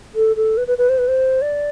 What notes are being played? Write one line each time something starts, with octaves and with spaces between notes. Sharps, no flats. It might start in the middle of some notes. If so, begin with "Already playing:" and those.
A4
A4
B4
B4
B4
C5
B4
C5
D5